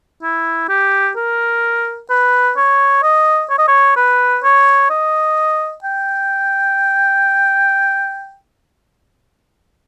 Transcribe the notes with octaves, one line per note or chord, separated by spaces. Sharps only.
E4
G4
A#4
B4
C#5
D#5
C#5
D#5
C#5
B4
C#5
D#5
G5